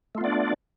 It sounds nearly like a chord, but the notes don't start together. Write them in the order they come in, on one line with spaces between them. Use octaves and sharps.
A3 F4 B3 D5 D4